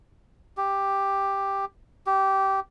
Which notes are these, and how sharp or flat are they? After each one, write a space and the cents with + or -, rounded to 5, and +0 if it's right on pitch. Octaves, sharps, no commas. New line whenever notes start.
G4 +5
G4 -15